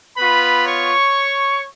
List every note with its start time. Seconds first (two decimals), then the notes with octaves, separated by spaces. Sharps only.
0.17 B3 F4 B4 B5
0.65 C#5 C#6